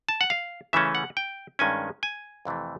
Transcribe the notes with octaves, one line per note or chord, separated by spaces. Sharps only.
A5
F#5
F5
C#3 E3 A3 C#4 E5
F#5
G5
G2 D#3 G#3 C#4 G#5
G#5
F2 C3 E3 A3